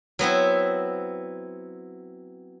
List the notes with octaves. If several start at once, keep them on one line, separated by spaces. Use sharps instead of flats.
F#3 B3 C4 E4